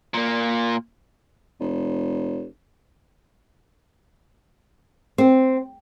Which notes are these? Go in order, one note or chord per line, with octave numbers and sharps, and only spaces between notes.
A#2 A#3
F1
C4